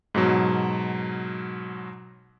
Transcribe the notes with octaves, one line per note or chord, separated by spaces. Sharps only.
G#2 B2 F#3